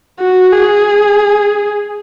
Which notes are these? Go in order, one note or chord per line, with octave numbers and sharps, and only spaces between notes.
F#4
G#4